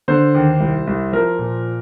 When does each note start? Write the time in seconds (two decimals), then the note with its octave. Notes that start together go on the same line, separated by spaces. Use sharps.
0.08 D3 C5
0.35 D#2
0.60 C2
0.87 C2
1.12 F3 A#4
1.39 A#2